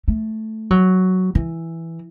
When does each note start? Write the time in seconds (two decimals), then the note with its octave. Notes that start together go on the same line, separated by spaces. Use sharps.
0.08 A3
0.70 F#3
1.35 E3